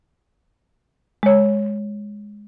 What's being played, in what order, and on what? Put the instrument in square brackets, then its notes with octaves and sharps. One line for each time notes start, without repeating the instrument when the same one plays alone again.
[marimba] G#3 C#5